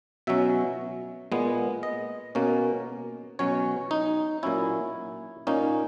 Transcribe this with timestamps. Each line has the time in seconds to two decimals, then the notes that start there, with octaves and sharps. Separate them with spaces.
0.27 B2 F#3 C#4 E5
1.32 A#2 G#3 B3
1.83 D#5
2.35 B2 A#3 C#4
3.39 B2 F#3 C#4 C#5
3.91 D#4
4.43 A#2 F#3 C#4 E4
5.47 A#2 A#3 C#4 D#4